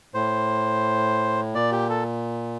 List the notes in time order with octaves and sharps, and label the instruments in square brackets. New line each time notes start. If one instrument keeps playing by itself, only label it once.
[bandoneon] A2 C5
A#2 D5
G4
A4